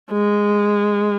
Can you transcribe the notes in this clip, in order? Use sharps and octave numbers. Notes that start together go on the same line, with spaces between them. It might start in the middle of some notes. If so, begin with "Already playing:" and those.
G#3